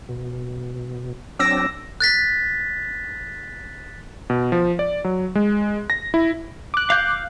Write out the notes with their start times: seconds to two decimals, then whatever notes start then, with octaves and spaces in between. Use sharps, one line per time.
0.09 B2
1.39 F#3 C4 D4 D6 E6 A#6
2.00 F#6 A6 B6
4.30 B2
4.52 F3
4.79 D5
5.04 F#3
5.35 G#3
5.90 A#6
6.14 E4
6.74 D6 F#6
6.90 F5 G6